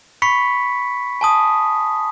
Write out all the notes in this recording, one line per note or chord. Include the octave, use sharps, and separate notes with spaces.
B5 C#6 B6 C#7
G#5 A5 D#6